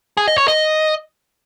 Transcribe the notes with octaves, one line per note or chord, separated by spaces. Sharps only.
G#4
D#5
C#5
D#5